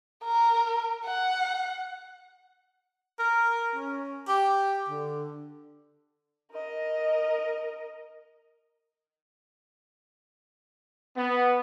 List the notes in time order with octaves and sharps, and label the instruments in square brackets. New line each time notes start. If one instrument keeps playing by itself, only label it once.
[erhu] A#4
F#5
[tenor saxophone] A#4
C#4
G4
D3
[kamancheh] A#4 D#5
[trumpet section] B3